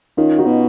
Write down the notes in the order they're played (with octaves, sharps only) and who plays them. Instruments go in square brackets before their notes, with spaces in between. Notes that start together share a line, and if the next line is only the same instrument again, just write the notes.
[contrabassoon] D#3 [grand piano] C#4 F4
[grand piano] D#4 F#4
[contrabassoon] B2